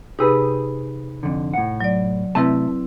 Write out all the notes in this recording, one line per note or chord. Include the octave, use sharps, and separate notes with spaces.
C3 D#4 G4 G#4 B4
F2 D3
A2 F#5
F#3 D5
C3 A3 C4 E4 B4 A5